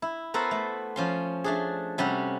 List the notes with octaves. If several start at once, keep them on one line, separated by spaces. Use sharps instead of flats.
E4
B3 F#4 A4 A#4 C5
A3
F3 C#4 C6
A3 D4 G#4
C3 G3 C#4 F#4